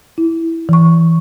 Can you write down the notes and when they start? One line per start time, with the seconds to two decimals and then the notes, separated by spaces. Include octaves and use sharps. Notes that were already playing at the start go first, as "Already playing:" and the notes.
0.18 E4
0.69 E3 C#6